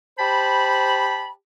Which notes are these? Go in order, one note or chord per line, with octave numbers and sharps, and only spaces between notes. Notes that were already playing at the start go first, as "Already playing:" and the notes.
G4 C5 A5 B5